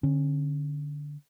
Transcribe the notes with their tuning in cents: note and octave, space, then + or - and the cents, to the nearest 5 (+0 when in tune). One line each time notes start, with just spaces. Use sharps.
D3 +0 C#4 -35